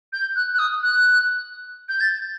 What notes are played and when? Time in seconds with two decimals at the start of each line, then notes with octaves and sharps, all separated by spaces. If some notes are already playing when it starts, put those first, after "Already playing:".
0.13 G6
0.36 F#6
0.54 F#6
0.59 D#6
0.83 F#6
1.89 G6
2.00 A6